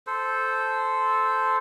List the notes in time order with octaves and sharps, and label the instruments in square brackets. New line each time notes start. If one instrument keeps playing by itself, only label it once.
[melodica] A4 C5